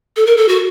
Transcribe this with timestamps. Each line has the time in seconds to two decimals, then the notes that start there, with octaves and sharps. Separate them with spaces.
0.17 A4
0.27 A#4
0.37 A4
0.48 F#4